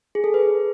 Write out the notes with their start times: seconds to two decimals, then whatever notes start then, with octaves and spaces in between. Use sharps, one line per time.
0.15 G#4
0.24 A4
0.34 B4